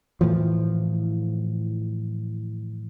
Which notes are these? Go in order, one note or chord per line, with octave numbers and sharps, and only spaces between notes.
A2 E3 F3